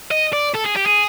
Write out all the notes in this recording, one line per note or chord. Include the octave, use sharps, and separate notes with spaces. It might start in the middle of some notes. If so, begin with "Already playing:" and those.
D#5
D5
A4
G#4
G4
G#4